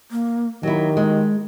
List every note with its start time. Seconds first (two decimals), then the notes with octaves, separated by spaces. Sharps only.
0.11 A#3
0.63 D#3 F#3 E4 G4
0.97 G#3